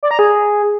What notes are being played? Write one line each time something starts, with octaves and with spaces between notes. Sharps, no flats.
D5
A#5
G#4